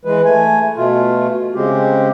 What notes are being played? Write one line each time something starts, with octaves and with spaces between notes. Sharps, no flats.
E3 G#3 B4
A3 G#5
B2 A3 F4
C#3 G#3 C4 G4